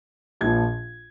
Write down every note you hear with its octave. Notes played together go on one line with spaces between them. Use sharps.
A#1 A#2 F3 G#6